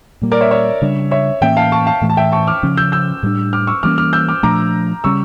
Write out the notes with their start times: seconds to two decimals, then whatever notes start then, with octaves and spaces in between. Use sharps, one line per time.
0.22 A#2 G3 A#3
0.31 A#4 D5
0.41 C#5 E5
0.51 C#5 E5
0.82 C#3 G3 D4
1.11 C#5 E5
1.41 A2 E3 A#3 C#4 E5 G5
1.57 F5 A5
1.72 A5 C#6
1.87 F5 A5
2.02 A2 E3 A3
2.10 A5
2.17 E5 G5
2.32 A5 C#6
2.47 D6 F6
2.63 C#3 F3 C#4
2.77 E6 G6
2.92 E6 G6
3.23 A2 G3 D4
3.53 D6 F6
3.67 C#6 E6
3.83 E3 G3 A#3 C#4 D6 F6
3.98 D6 F6
4.13 E6 G6
4.29 D6 F6
4.43 A#2 F3 A3 D4 A#5 D6
5.04 C#3 G3 C#4 C#6 E6